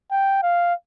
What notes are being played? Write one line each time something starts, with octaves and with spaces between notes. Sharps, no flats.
G5
F5